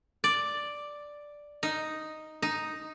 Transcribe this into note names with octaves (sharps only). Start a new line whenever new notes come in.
D5
D#4
D#4